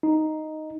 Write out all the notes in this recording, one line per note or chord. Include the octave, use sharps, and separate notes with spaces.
D#4